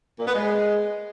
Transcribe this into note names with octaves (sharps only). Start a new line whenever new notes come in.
A#2
B3
G#3